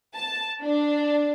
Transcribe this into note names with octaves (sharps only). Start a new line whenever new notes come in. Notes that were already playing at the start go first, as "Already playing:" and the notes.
A5
D4